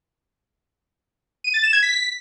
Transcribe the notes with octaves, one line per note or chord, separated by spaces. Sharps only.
D#7
A6
E7
G#6
B6